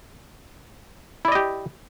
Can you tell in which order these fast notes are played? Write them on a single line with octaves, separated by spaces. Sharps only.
E4 D5 D#5 G4